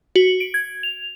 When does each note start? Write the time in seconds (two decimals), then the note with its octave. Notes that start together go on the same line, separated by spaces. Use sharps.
0.16 F#4
0.40 D7
0.54 G#6
0.83 F7